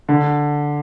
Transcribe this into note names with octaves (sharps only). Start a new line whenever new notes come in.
D3